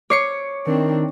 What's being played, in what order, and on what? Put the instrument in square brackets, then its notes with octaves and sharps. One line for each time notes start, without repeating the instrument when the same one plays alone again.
[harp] C#5 [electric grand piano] D6 C7 C#7
[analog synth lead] D#3 [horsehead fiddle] C4 D4